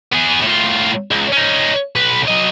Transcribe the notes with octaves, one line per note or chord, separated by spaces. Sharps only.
B3 G#4
A2 F4
C#2
C#4 D#4
B1 B4
F#3 D#5